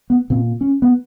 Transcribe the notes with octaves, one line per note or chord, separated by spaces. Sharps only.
B3
A#2 C4
C#4
B3